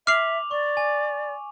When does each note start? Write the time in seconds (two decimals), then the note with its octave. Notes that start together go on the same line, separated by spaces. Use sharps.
0.07 E5 D6 F6 C7 F7 F#7
0.51 D5 C#6
0.77 G#5